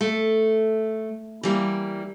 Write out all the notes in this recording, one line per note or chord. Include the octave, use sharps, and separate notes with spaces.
A3
E3 G3 A#3